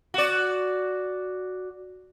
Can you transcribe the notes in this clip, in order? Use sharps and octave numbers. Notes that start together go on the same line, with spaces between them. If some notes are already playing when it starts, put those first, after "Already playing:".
F#4 D5